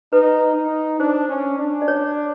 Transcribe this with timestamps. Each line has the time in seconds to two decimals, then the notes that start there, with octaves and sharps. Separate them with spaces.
0.13 D#4 B4
0.56 D#4
1.00 D4 C5
1.29 C#4
1.59 D4
1.82 D5
1.88 C#5